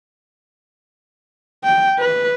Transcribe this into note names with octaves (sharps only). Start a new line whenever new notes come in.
G5
B4